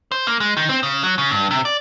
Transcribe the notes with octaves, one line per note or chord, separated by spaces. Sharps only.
C5
A#3
G#3
D#3
C4
C#3
F#3
C#3
G2
C3
D5